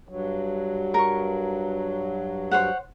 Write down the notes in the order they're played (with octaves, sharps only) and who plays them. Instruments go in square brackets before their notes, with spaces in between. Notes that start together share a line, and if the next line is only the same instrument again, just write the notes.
[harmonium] G2 F#3
[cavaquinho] A#4 C#6
C5 C#5 F#5